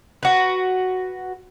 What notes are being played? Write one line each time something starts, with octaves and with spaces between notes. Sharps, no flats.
F#4 B4